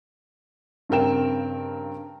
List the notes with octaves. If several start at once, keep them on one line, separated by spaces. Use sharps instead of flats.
G2 C#3 C4 A#4 G5 E7